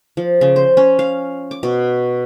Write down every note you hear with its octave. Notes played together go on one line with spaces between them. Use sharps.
F3
C#3
C5
C#4
F5
D6
B2